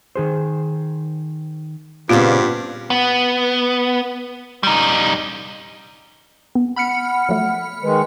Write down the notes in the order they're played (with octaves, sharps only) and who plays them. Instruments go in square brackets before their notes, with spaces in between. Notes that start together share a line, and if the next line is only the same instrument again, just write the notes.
[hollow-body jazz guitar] D#3 G#4 C5
[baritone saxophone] G2 [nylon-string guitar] A#2 C#3 [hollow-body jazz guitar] B3 C4 C5 [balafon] F4
[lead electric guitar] B3
G3 D#4
[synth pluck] B3
[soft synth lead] F#5 [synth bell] B5 F6 C#7
[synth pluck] F3 F#3 A3
[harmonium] D#3 G#3 [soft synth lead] B4